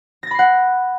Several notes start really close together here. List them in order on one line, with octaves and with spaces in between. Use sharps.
A#6 A6 B5 C7 F#5